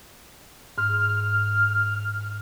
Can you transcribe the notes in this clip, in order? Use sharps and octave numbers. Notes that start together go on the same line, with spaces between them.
G#2 F6